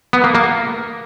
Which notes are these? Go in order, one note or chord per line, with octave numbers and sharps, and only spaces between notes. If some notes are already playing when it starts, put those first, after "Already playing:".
B3
A#3
A#3